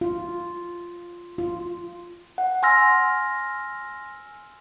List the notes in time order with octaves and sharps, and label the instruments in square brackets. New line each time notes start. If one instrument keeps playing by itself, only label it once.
[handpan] F4
F4
[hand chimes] F#5
G#5 C6 E6 F6 A#6